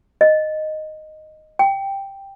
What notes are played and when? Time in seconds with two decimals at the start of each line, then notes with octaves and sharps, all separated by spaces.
0.21 D#5
1.59 G5